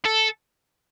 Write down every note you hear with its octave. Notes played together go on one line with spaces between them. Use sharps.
A4